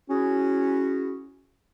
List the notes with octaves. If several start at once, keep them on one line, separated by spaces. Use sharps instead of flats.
C#4 E4 F#4 G#4